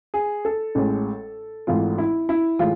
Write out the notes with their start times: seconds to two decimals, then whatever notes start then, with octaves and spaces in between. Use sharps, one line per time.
0.14 G#4
0.45 A4
0.75 A1 A2 G#3
1.67 G#1 G#2 E3 A3 F4
1.98 E4
2.29 E4
2.59 A2 E3 G#3 F4